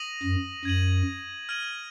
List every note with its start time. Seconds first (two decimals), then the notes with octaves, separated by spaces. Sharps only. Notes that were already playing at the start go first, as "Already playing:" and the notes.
Already playing: D#6 A#6 D#7 F#7
0.23 F#2
0.65 F#2 G#6 D#7 F#7
1.49 F6 G#6 D#7 F#7